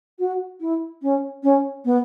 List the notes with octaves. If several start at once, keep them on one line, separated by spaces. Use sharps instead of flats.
F#4
E4
C#4
C#4
B3